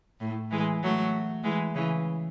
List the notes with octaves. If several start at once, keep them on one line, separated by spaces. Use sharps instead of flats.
A2
E3 G#3
F#3 A3
E3 G#3
C#3 E3